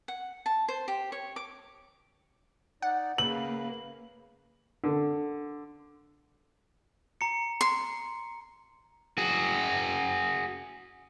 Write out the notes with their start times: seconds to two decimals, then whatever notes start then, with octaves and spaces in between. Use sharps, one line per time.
0.08 F#5
0.46 A5
0.69 C5
0.88 G4
1.12 C#5
1.36 D6
2.82 D#4 D5 F#5
3.18 C#3 A#3 B4 F#7
4.84 D3
7.21 A#5 C#7
7.61 C6
9.18 F#4 G#4